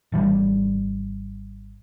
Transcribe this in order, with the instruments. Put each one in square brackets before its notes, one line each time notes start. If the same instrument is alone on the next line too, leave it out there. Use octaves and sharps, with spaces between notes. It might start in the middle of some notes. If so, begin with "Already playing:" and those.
[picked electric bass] G#1 E3 G3